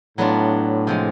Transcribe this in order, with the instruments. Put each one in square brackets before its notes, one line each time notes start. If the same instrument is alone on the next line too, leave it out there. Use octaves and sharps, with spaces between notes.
[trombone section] A2 [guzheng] F#3 B3 D4 F4
[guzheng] C3 F3 G#3